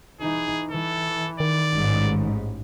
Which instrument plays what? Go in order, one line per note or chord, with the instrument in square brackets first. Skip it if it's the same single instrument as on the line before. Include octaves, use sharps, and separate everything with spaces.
[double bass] E3 D#4 [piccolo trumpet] G#4
[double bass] E3 [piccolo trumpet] A4
[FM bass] D#3 [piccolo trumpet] D5
[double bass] A1 [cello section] G#2